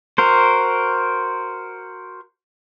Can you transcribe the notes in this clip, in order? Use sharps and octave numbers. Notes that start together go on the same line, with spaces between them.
F#4 A#4 C5